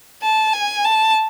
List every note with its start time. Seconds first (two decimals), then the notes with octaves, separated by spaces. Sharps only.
0.22 A5
0.53 G#5
0.84 A5